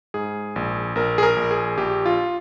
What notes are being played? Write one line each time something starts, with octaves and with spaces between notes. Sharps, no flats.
G#2 G#4
A#1
A#1 A#4
G#4
A#4
A#1
G#4
A#1 G4
F4